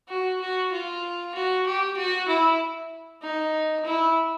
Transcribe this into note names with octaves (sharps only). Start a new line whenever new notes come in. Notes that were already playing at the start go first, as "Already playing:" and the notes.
F#4
F#4
F4
F#4
G4
F#4
E4
D#4
E4